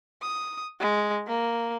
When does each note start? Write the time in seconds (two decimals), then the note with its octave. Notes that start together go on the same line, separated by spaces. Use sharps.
0.22 D#6
0.80 G#3
1.27 A#3